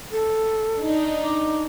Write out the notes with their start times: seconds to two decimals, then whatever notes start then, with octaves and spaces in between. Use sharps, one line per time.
0.12 A4
0.81 D4 D#4
1.24 D6